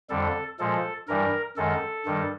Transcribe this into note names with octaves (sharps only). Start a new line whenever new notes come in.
F2 D3 G3 A4
A#2 F3 G#3 A4
G2 E3 G3 A#4
F#2 D#3 G#3 A4
G2 D#3 G3